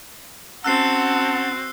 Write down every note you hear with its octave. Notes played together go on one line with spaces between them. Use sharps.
C4 C#4 F#4 F#5 A5 E6 F#6 C7